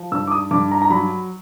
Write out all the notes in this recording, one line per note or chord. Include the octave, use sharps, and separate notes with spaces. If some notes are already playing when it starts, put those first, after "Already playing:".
Already playing: F3
G2 E6
D6
D#6
G2 D6
A#5
A#5
F#3 B5